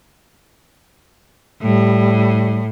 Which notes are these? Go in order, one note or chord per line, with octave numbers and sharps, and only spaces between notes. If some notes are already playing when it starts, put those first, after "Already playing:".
A2 G3